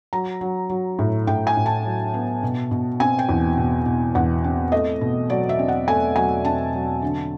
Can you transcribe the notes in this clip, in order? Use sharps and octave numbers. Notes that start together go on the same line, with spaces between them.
F#3 A#5
F#3
F#3
A2
A2 G5
G#5
A2
A5
F#3
B3
B2
B2
C4 G#5
G5
E2
B2
B2
E2 F#5
C4
A3 D#5
B2
F#3 D5
E5
C4
F#5
A3 G#5
F#3 G#5
C4 A5
F#3
D3